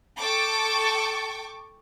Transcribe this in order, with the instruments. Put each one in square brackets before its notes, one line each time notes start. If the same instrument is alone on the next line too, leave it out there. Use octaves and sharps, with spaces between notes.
[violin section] A4 G5 A5 C#6 D6